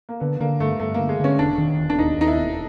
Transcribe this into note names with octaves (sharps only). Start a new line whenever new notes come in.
A#3
D3 B3
D3 A#3
G2 A3
G2 A3
D3 A#3
G#3
D3 C#4
E1 D4
D#3
E1
D4
D#2 D#4
D#2 D#4
E4
E1